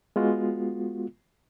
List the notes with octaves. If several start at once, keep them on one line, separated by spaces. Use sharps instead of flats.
G#3 B3 F4 F#4